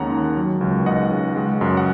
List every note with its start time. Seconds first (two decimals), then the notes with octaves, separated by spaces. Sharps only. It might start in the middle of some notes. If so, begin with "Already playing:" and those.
Already playing: D#2 G#3 C#4 F#5 A#5
0.12 D#3
0.37 F#3
0.61 C#2
0.86 C#2 D#5 F#5
1.11 C#3
1.36 G#3
1.61 F#2
1.77 F#5